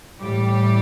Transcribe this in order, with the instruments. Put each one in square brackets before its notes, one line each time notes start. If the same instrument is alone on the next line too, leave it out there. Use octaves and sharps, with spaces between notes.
[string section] A2 E3 G3 G4